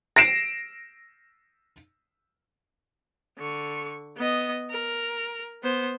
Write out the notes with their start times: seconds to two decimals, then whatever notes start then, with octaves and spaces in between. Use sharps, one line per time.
0.16 A#6 C7 D7 E7
3.38 D3 C#6
4.17 B3 D#5
4.70 A#4
5.63 B3 C5